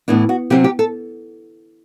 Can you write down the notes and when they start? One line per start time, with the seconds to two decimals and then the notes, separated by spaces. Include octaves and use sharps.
0.08 A2 E3 B3 D4
0.29 F#4
0.50 C3 F#3 C4 G4
0.64 G4
0.79 A4